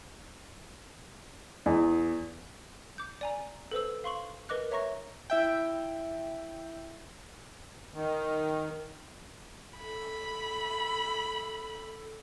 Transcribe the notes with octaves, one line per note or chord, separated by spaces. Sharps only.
E2
D6 G6
D5 G#5 A#5
A4 B4 C5 E6
F5 C6 C#6 F#7
A#4 B4 D#5 D6 F#6
C#5 E5 A#5 C#6 A#6
E4 E5 G5
D#3
A4 B5